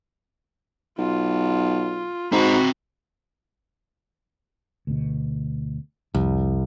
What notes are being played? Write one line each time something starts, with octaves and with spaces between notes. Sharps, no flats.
B1 F4
G#2 C4 F#4 A#5 B5
D2 B2
C2 F2